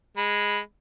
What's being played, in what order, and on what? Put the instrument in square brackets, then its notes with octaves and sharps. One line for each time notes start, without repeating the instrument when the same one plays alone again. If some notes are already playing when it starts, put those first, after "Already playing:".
[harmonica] G#3 B5